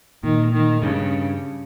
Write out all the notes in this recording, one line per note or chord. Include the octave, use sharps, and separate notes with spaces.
A#2 D#3
D#3
G2 C#3